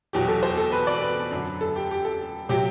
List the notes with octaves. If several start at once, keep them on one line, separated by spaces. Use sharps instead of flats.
E2 B2 F#3 G4
A4
C5
A4
B4
D5
B4
F#2 D3 F#3
A4
G4
G4
A4
C3 F#3 G4